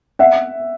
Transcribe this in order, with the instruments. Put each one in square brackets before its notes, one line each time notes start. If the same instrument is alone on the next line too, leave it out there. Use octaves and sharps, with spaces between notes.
[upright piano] E5 F#5